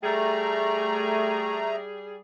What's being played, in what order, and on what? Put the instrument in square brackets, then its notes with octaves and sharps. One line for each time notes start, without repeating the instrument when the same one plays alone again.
[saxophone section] G3 G#4 [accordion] A3 A#5